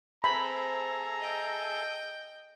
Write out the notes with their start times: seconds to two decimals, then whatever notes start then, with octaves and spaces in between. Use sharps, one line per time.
0.24 C4 G#4 A4 C5 E5 A#5 B5
1.20 D#5 G5